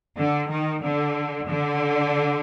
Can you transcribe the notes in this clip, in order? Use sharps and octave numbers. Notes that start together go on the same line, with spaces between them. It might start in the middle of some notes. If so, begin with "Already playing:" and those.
D3
D#3
D3
D3